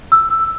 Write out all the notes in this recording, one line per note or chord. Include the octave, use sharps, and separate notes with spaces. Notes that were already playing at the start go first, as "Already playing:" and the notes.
E6